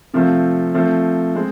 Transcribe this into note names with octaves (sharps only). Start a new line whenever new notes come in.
C3 F3 A3 C4 F4
F3 A3 C4
G#3 C4